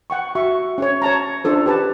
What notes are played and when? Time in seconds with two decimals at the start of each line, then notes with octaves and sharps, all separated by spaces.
0.10 F#5 G5 C#6
0.35 F#4 E5 C#6
0.78 C#4 G#4 C#5
1.02 C#5 A5 A#5
1.44 C#4 D4 F4 A4 C5
1.66 G4 B4 A5